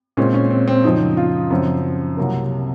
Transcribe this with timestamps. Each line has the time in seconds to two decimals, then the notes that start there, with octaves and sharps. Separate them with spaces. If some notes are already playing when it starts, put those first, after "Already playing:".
0.17 A#2 G#3 C4 C#4
0.34 C#4
0.51 C4
0.68 C4
0.84 F#2 C#3 F3 D#4
1.17 F4
1.50 F#2 C#3 F3 C4
2.17 C2 C3 F#3 A#3